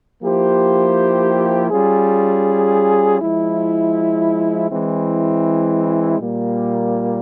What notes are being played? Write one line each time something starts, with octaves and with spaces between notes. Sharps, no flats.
F3 A#3 E4 G4 C5
G3 C#4 F4 G#4
F3 G#3 E4
E3 G#3 C4 E4
A#2 G3 A#3